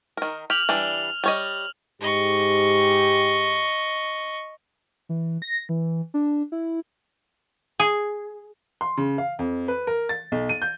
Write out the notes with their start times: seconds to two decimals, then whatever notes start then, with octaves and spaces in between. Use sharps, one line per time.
0.17 D#3 A#4
0.50 G4 F6 F7 F#7
0.69 E3 G3 D4
1.24 G3 C#5 D#5
2.01 G#2 G4 D#5 C#6
5.09 E3
5.42 A#6
5.69 E3
6.14 D4
6.52 E4
7.80 G#4
8.81 C6
8.97 C#3
9.18 F5
9.39 F2
9.68 B4
9.87 A#4
10.09 A6
10.32 B1
10.49 D#7
10.62 G6